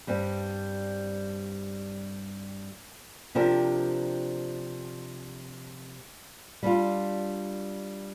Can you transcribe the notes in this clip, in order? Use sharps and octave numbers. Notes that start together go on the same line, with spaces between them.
G2 G3 C4
C3 F3 D4 G4 A#4
G3 D4 F4